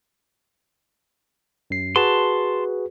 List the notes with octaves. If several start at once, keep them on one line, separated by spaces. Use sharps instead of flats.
F#2 C7
F#4 G#4 B4 A5 C6